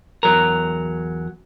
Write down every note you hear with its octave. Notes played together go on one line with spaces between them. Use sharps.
E2 F#3 A#4